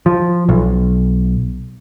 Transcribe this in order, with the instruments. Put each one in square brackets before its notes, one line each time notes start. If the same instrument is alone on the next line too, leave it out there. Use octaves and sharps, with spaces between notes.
[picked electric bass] F3
B1